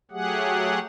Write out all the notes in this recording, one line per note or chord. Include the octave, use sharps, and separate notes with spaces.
F#3 A3 G4 G#4 F#5